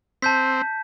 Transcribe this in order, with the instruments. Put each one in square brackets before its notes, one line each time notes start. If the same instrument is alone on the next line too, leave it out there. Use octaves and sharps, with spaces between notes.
[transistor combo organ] C4 [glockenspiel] A5 G6 B6